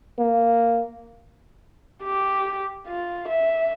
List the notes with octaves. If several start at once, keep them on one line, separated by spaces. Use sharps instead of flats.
A#3
G4
F4
E5